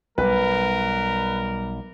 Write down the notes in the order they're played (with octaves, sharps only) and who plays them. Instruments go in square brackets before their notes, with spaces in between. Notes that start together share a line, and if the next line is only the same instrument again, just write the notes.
[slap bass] B1 [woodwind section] G3 [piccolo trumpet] A#4 [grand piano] B4